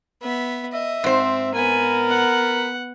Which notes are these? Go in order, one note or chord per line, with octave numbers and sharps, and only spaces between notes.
B3 E5
D#5 E5
G#2 C4 C5
B3 A#4 G#5
F#5